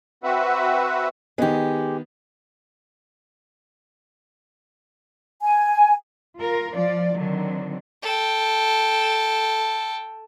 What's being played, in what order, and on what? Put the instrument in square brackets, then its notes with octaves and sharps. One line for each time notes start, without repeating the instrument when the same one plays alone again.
[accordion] C4 F#4 B4 E5 F#5
[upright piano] D#3 B3 [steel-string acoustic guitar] G#3 G4
[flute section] G#5
[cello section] F4 A#4
F3 F4 D5
D3 D#3 F#3 C4
[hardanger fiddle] A4 G5